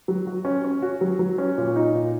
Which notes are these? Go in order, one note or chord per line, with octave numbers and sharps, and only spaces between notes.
F#3
F#4
C#4
C#4
F#4
F#3
F#3
C#4
A#2
D#4
A#2